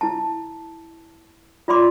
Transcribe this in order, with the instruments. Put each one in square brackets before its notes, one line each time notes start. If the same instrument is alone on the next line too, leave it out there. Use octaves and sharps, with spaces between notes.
[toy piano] E4 A5
F4 D5 B5 C6 D6